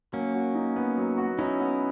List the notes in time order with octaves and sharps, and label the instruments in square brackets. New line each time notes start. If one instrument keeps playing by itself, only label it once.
[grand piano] F#3 [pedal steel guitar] A#3 C#4
[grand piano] F#4
D#4
B3
F#3
F#4
[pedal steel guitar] C#4 E4 [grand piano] D#4
[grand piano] B3